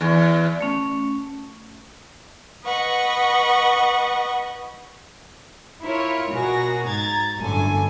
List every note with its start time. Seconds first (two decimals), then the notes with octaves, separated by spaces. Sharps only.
0.01 E2
0.61 A3 C#4
2.64 B4 D#5 F#5 C#6
5.84 E4 F4 A#4 C#5
6.32 B2 F#4 G#4 A#4 A#6
6.85 G#2 A#5 G#6 A6
7.38 G1 F#2 A2 D3 A4 G#5